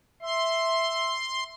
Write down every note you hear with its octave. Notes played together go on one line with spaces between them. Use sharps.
E5 C6